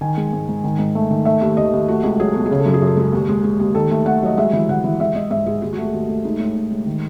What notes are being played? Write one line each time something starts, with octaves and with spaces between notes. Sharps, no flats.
D#3 G#5
G#3
G#2
G#2
D#3
G#2
A3
D#3
A3 E5
D#2
D#2 D#5
D#2
A3 F#4
C#2
F#3 G#4
B2 A4
G#4
C#3
A4
F#2
G#4
F#2
A4
G#3 G#4
D#2
G#3
G#3
D#2
D#3 A4
A3
A3 F#5
F#3 D#5
G#3 E5
E3
E3 F#5
E3
G#3 E5
G#3 D#5
G#2 E5
G#3 G#4
D#2 G#4
F#4
A3 G#4
D#2 F#4
A3
G#3 D#4
A2
A2
G#3
D#3